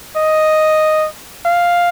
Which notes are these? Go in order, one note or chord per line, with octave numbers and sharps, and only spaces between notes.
D#5
F5